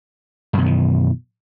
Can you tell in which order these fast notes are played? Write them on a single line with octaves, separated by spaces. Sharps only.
F#2 B2 D#3 E3